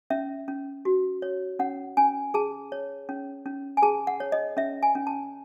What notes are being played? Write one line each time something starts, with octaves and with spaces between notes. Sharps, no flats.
C#4 E5
C#4
F#4
C#5
C#4 F#5
C#4 G#5
G#4 A5
C#5
C#4
C#4
G#5
G#4 A5
F#5
C#5
D#5
C#4 E5
G#5
C#4
A5